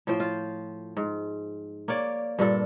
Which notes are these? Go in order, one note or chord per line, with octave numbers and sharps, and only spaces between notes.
A2 F3 C5 G5
F4
G#2
A#3 C#5 D5
G2 A#2 D4 A4